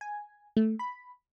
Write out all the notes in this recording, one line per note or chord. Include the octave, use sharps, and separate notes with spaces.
G#5
A3
B5